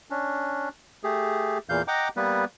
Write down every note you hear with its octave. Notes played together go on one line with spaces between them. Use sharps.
C#4 D4
A3 G4 G#4
E2 A#2 E3 F5 G6
D#5 F#5 G5 A#5 D6
G3 A#3 B3 B4